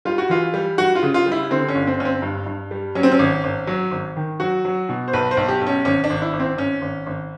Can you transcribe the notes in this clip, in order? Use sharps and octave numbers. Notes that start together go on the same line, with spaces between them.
G3 F4
F#4
E3 F4
G3
G3 F#4
F4
C#3
F4
G3
E4
D3 C4
C#4
G1
C4
G1 C#4
C4
G2
G2
G3
F#3 C#4
C4
C#4
G#1
G#1
F#3
G#1
D#3
F#3 F#4
F#3
B2
C5
B1 B4
C5
B1
G4
B1
C#4
G#1 C#4
D4
G#1
E4
G#1
C4
G#1 C#4
G#1
G#1